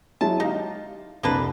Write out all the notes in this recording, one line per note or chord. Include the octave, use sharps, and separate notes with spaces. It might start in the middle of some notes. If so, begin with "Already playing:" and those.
F#3 G#3 E4 A5
D#4 G4 F5
F1 C2 A#3 D4 B4